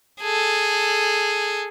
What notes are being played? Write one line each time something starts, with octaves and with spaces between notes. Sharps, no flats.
G#4 A4